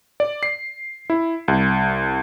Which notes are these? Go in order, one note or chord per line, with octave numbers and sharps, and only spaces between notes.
D5
C7
E4
C2